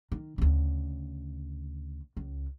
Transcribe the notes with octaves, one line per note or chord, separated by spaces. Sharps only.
D#3
D2 C#3
C#2